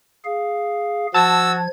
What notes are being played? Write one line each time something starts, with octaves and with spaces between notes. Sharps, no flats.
G#4 F5
F3 F#4 A5 E6 G#6